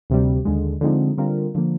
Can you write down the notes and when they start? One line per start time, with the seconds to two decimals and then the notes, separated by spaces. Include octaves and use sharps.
0.10 D2 C3 G3
0.45 D#2 D3 G#3
0.81 D3 F3 G#3 C4 D#4
1.18 D3 G3 C4 F4 A#4
1.55 D3 F3 A#3